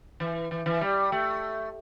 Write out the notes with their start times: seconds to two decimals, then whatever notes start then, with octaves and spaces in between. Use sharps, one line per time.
0.20 E3
0.51 E3
0.66 E3
0.81 G3
1.12 A3